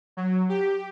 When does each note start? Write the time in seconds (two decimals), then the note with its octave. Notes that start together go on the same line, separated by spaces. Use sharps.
0.17 F#3
0.49 G4